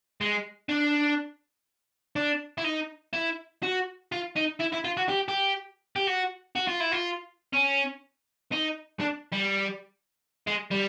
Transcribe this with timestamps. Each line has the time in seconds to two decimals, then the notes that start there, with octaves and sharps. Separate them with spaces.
0.21 G#3
0.69 D4
2.16 D4
2.58 E4
2.64 D#4
3.13 E4
3.63 F#4
4.12 F4
4.36 D#4
4.60 E4
4.73 E4
4.85 F4
4.97 F#4
5.09 G4
5.28 G4
5.96 G4
6.07 F#4
6.56 F#4
6.68 F4
6.80 E4
6.92 F4
7.53 C#4
8.52 D#4
9.01 D4
9.33 G3
10.47 G#3
10.71 G3